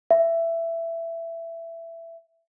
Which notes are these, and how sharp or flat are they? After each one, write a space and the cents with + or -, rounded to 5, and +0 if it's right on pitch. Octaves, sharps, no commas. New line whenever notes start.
E5 +15